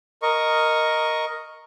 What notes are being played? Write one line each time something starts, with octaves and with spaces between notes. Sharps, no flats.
A#4 D#5 C#6